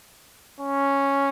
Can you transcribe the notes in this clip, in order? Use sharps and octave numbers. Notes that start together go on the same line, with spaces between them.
C#4